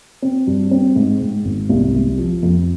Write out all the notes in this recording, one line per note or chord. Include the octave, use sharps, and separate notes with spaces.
C4
G2
C4
G#2
G#2
G#1
C2
C2
F3
F2